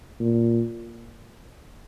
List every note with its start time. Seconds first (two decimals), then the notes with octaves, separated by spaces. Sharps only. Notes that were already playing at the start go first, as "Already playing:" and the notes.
0.20 A#2